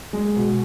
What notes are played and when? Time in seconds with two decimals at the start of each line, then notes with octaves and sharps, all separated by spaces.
0.13 G#3
0.36 B2